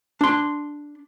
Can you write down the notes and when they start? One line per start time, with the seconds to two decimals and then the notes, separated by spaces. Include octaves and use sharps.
0.21 D4 C6